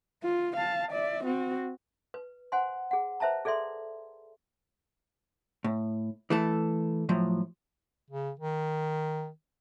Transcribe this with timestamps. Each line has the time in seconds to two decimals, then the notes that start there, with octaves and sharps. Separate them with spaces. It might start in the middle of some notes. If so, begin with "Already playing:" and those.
0.23 F4
0.56 F5 A5
0.92 D5 E5
1.24 C4 F#4
2.14 B4
2.52 C5 F#5 G#5 C6
2.91 G#4 F#5
3.20 B4 C5 E5 A5 A#5
3.45 G#4 A4 D5 E5 C6
5.64 A2
6.30 E3 A3 A4
7.09 A2 F3 F#3
8.10 C#3
8.39 D#3